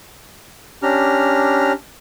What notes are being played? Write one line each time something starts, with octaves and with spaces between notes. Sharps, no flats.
C#4 D4 G4 A#5 F6